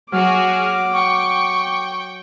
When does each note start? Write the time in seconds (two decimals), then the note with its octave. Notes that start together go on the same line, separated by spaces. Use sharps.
0.12 F#3 F#4 G#4 D6 F6
0.93 G5 C#6